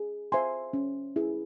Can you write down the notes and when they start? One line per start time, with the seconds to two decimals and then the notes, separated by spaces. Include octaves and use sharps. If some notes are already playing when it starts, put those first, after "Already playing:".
Already playing: G#4
0.32 C5 E5 G#5 C6
0.73 C#4
1.16 E4 G#4